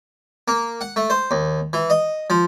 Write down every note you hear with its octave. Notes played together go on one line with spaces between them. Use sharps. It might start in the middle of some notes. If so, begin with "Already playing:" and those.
A#3
F#5
A3
C5
D#2
E3
D#5
F3